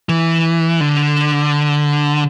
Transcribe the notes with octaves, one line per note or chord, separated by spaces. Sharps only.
E3
D3